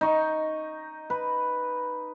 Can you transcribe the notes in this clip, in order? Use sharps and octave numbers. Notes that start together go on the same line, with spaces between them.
D#4 C#6
B4